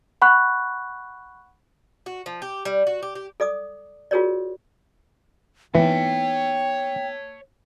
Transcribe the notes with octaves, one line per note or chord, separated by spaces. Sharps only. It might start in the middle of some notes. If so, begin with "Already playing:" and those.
F#5 B5 C#6 F#6
F#4
F3
G4
G3
F#4
G4
G4
A4 D5 D6 D#6
F4 F#4 G#4 A#4 C#5 D5
E3 B3 D#4 C#5 G5 A5